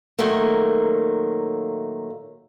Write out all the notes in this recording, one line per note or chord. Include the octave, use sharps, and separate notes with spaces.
A#2 D#3 F#3 A3 A#3